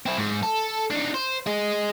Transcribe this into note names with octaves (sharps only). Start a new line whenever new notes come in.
C4 E4
G#2
A4
D4 D#4
C5
G#4 D#5